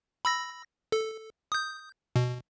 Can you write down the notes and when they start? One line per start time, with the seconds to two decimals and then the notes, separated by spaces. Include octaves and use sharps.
0.25 B5 E6 A#6
0.92 A4
1.52 D#6 G6
2.16 B2